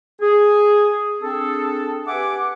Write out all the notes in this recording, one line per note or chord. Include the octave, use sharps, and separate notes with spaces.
G#4
C4 D4 G#4 A4
G4 B4 E5 F#5 G#5 D6